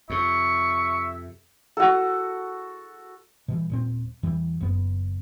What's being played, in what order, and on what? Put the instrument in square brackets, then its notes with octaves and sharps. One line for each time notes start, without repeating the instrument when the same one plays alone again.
[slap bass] F2 C3 [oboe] E5 [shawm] C#6
[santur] F#4 A4
[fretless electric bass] B2 E3 G3
D#1 A#2 C4
E2 E3 G3
F#1 F#2 B3